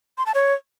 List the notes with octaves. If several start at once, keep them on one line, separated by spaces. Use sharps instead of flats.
C6
A5
C#5